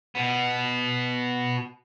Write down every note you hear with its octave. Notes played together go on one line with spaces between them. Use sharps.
B2 B3